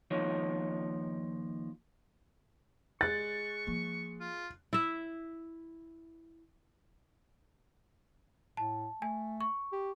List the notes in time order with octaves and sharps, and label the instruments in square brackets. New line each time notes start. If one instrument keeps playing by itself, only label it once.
[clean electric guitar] D#2 F3 D#4 C#5
[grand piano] G#3 F#6 [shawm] C#6 [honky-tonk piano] A6
[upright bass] F3 A#3
[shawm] F4
[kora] E4 E5
[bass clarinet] A2 [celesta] A5
[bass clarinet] A3 [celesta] G#5
[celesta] C#6
[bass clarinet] G4